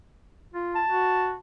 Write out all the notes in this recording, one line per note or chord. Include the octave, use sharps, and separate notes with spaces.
F4
A5
F#4